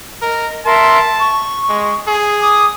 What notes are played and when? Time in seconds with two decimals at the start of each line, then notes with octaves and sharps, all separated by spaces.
0.22 A#4 D#5
0.65 A#4 E5 A5 C6
1.19 C#6
1.69 G#3
2.08 G#4
2.41 D6 D#6